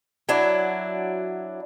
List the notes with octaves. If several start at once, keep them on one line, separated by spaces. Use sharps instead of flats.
F#3 D4 E4